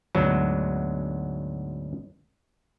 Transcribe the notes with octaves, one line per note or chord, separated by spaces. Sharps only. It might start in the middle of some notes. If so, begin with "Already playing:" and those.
D2 G#2 B2 F#3